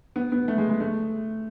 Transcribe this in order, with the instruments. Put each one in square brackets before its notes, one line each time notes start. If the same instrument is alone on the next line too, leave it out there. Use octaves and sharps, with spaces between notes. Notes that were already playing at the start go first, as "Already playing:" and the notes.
[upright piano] B3
B3
A3
G#3
G#3
A3